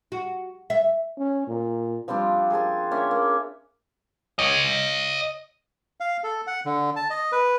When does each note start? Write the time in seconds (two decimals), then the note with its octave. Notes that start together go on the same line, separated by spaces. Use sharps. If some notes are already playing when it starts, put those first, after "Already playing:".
0.12 F#4
0.70 E5
1.18 C#4
1.48 A#2
2.08 F3 G3 C4 D4
2.50 G#4 A#4 C5 A5
2.91 A#3 C#4 D4 E5
3.11 A#3
4.39 C#5 D#5
6.00 F5
6.24 A4
6.47 F#5
6.66 D3
6.96 A5
7.10 D#5
7.32 B4